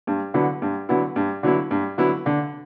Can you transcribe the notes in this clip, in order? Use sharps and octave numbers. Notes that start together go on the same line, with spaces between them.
G2
D3 F#3 B3 E4
G2
D3 F#3 B3 E4
G2
D3 F#3 B3 E4
G2
D3 F#3 B3 E4
D3